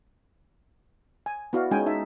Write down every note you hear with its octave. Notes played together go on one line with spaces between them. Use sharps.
G#5
B3 E4 F#4 D5 F5
G#3 C#4 D#4 G5 G#5
D#4 E5 A5